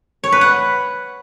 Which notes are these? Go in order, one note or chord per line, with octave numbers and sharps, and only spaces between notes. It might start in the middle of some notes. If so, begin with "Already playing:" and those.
C#5
B4
F#5